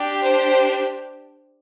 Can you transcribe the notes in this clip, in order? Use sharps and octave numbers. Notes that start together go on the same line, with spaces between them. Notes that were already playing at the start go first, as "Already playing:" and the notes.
Already playing: D4 G4
C5